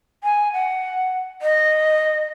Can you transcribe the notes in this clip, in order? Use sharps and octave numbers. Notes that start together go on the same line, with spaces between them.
G#5
F#5
D#5